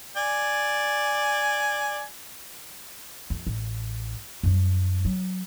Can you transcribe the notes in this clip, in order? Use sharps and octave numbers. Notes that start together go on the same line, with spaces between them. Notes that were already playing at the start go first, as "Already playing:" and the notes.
D5 G#5
F2
A1
F#2 G3
F#3